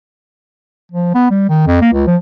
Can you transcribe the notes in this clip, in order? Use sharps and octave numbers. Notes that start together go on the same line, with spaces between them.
F3
B3
G3
D#3
F2
A#3
C#2
F3